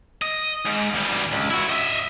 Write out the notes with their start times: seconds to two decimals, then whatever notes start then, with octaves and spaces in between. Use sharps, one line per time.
0.22 D#5
0.66 G#2
0.95 D2 G3
1.32 C#2
1.50 E4 F#4
1.70 D#5 E5